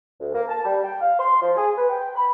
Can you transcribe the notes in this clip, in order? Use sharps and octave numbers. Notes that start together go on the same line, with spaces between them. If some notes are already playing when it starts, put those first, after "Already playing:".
D2
A#3
A5
G3
G5
F5
C6
F3
G#4
B4
G5
B5